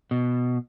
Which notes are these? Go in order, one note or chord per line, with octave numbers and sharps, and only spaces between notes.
B2